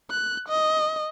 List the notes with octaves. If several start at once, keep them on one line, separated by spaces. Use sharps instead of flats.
F#6
D#5